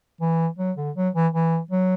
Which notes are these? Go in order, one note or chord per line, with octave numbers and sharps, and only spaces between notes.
E3
F#3
D3
F#3
E3
E3
F#3